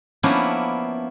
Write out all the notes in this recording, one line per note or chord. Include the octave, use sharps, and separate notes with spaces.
F3 A#3 B3 C#4 D4 E4